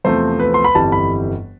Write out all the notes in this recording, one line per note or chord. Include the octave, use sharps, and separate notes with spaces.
E2 C3 F3 A3 C4 C5
B4
C6
B5
G1 F2 E3 G3 A5
B5